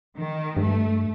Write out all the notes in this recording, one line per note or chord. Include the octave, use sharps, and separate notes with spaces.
D#3
G2 A3